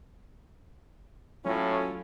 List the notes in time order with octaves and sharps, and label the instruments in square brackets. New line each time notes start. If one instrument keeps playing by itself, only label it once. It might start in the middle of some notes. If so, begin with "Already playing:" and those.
[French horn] A2 [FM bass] F#3 [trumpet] C#4 [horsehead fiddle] F4 A4